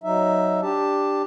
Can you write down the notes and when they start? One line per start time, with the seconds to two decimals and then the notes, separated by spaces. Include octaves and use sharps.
0.04 F#3 D#4 E5
0.62 D4 G4 A5